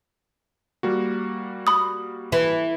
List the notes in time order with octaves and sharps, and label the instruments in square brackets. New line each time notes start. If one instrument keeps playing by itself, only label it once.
[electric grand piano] G3 A#3 F#4
[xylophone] B5 D#6
[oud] E3